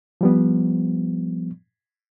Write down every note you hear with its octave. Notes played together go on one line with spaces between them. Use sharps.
F3 G3 B3